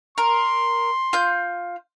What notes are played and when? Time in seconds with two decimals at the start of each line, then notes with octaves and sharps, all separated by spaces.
0.18 A#4 C6
1.13 F4 G6